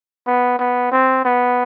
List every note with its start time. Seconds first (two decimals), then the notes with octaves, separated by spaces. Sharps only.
0.27 B3
0.59 B3
0.92 C4
1.25 B3